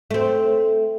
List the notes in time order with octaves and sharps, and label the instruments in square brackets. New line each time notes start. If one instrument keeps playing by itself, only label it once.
[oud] A3 C4